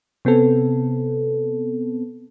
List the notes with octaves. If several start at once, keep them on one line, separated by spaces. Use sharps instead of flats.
C3 B3 C4 A4